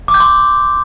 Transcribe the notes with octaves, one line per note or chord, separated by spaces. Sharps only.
D6
G6
C6